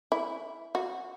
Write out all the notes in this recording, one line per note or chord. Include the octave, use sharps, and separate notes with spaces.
E4
F#4